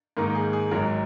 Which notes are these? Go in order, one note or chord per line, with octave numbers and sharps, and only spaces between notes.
G#2 D#3 A#3 D#4 A#4
G#4
G#4
G#1 G#2 F#3 A#4